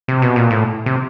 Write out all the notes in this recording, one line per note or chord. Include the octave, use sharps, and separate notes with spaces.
C3
B2
A#2
A2
C3